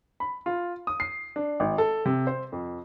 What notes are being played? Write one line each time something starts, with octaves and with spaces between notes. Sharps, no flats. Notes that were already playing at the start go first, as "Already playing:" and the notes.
B5
F4
D#6
C7
D4
G#1
A4
C3
C5
F2